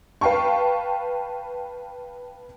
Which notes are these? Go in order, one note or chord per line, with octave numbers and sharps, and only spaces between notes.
B4 F5 G5 A5 C#6